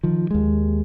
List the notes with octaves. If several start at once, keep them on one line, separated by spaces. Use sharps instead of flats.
D#3 F3
D#2 G#3